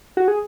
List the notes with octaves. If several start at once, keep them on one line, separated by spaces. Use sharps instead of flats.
F#4
G#4